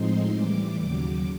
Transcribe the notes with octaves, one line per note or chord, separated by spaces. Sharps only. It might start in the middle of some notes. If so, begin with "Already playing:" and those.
Already playing: A2 F3 G#3 C4 D#4 C6
A2 E3 G3 D6
D#2 C#3 F#3 D6